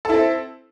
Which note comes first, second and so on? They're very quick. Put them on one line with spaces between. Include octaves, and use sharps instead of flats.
A4 E4 C4